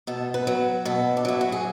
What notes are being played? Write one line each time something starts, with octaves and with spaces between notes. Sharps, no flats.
B2 A4
B4
F#3
B2 A4
D4
F#3 E4
F#4
G#4